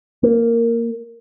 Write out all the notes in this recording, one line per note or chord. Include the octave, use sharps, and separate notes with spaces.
A#3